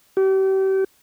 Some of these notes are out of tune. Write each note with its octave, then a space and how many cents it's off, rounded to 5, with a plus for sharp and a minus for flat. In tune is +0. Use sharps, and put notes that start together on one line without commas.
G4 -35